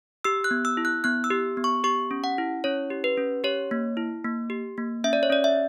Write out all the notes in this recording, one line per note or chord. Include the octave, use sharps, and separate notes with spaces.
G4 E6
F#6
B3
E6
E4
F#6
B3 F#6
E6
G4
B3
C#6
G4 C#6
C#4
F#5
E4
C#4 C#5
G4
B4
C#4
G4 C#5
A#3
E4
A#3
G4
A#3
C#4 E5
D5
C#5
C#4 D5
E5